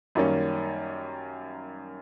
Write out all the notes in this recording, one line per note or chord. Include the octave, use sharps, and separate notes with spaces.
F#2 D#3 G3 A#3 C#4